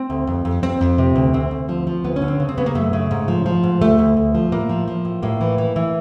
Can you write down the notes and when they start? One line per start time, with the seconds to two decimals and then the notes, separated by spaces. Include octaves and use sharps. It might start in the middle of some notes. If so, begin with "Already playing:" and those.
Already playing: C4
0.10 D2
0.27 F2
0.45 F2
0.63 F2 C4
0.81 F2
0.98 C3
1.16 D2
1.33 D2 C4
1.51 D2
1.69 F3
1.87 F3
2.04 D2 B3
2.16 C#4
2.22 D3
2.28 C4
2.40 C#3
2.49 C4
2.58 C#3 B3
2.66 A#3
2.75 F#2 A3
2.93 C#3
3.11 G#2
3.28 F3
3.46 F3
3.64 G#2
3.81 D2 A3
3.99 D2
4.17 D2
4.35 F3
4.52 A2 A#3
4.69 F3
4.88 F3
5.05 A2
5.23 A2 A#3
5.41 E3
5.58 E3
5.76 E3